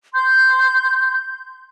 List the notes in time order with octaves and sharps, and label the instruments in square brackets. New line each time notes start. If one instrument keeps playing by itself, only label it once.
[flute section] C6 G6